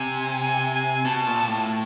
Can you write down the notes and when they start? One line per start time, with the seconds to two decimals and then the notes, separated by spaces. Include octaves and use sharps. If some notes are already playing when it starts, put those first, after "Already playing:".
Already playing: C3 G#5
0.42 G#5
0.74 G#5
1.05 B2 A5
1.27 A#2
1.48 A2